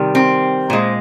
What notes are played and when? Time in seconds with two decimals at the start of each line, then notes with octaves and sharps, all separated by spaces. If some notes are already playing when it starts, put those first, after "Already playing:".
Already playing: C3 D#3 G3
0.15 C4
0.70 A#2 G#3